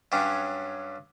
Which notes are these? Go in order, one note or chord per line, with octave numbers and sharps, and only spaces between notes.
G2 F#3 G3 C#4